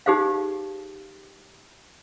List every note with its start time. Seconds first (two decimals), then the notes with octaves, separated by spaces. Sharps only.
0.06 D#4 G4 G#4 C5 F5